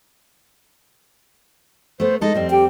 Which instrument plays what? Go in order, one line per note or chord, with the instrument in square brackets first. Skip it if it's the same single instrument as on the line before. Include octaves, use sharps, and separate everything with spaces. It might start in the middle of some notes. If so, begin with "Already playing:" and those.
[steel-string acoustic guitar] A3 B3 [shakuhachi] C5
[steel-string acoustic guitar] G#3 D#4 A4 [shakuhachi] D#5
[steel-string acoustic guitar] F2 G3 C4
[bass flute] G4 [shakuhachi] G5